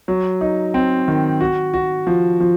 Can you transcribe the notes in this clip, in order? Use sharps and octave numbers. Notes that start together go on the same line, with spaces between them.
F#3
D#4
C4
D#3
F#4
F#4
F3
F3